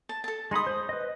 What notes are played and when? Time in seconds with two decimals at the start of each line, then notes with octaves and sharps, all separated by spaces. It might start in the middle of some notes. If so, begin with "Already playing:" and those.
0.09 A5
0.24 A4 A5
0.51 G#3 D#4 B5 C6 D#6
0.67 C5
0.89 B4 D#5